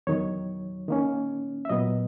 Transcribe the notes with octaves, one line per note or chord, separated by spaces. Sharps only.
E2 D#3 F#3 C#5
D#3 A#3 C#4
E5
A#2 F#3 B3 D#5